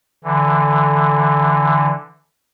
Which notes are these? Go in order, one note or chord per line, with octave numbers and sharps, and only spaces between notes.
D3 E3